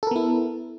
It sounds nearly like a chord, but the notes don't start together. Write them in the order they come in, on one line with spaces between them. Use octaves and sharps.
A4 A#4 B3 E4